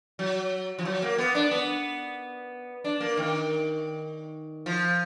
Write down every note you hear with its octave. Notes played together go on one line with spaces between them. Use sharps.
F#3
F3
F#3
A#3
B3
D4
B3
D4
A#3
D#3
F3